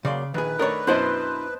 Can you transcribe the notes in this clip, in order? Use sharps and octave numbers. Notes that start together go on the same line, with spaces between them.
C#3 F#3 A#3 G#4 D5 C6
A#1 D#3 G#4 B4
D#3 A3 D4 A#4 C#5 D#5
F#2 B2 D4 E4 C5 D#5 A5 C6